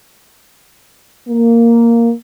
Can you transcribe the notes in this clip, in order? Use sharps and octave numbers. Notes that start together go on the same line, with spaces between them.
A#3